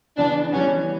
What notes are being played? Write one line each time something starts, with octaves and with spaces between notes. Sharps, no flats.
C#3 E3 B3 D4
E3 G3 B3 C#4